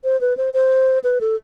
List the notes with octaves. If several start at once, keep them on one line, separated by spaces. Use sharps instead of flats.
C5
B4
C5
C5
B4
A4